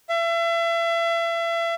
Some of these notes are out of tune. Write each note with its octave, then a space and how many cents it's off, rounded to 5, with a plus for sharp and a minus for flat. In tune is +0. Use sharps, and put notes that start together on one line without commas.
E5 +35